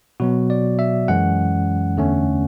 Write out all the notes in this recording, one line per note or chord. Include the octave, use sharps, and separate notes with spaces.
B2 F#3 B3 F#4
D5
E5
F#2 E3 G#3 C#4 F#5
E2 D3 A3 C#4